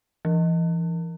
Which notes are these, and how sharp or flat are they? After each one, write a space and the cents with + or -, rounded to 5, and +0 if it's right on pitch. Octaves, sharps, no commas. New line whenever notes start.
E3 +30